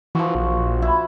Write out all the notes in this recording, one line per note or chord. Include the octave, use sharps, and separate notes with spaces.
E3 F3 F#4
A#1
E4